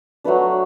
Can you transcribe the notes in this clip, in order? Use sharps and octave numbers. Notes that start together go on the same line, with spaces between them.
F#3 A3 D4 B4